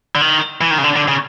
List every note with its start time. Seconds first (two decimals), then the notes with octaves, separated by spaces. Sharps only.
0.15 D3
0.21 D#3
0.61 E3
0.71 D#3
0.78 C#3
0.84 D3
0.96 D3
1.08 C#3